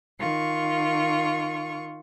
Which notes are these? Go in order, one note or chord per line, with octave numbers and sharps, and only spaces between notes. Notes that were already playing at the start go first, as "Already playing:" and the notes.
D#3 F4 C#6